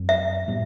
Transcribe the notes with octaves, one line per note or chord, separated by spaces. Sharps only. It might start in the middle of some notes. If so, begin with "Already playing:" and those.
Already playing: F#2 F#3 C4
E5
A2 G3 B3